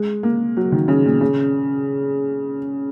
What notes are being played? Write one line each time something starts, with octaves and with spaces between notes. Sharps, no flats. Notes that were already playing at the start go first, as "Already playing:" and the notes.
Already playing: G#3
A#3
F#3
D#3
C#3
A#2
C#3